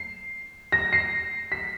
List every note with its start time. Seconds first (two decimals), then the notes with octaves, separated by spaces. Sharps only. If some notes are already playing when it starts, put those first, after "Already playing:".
Already playing: C7
0.72 A#6
0.93 C7
1.52 B6